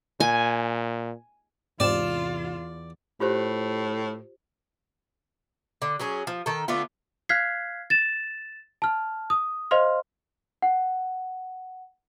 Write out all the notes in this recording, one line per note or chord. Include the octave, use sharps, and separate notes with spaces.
A#2 G#5
E2 G#2 C3 F4 D5 E7
A2 F4 G4 C5
D3
F#3 C#4 G#4
F3
D#3 A4
D3 A3 B3 F4
F5 F6 F#6 G#6 B6 C7
A6 E7
A5 F6
D#6
C5 D#5 F5 C6 F6
F#5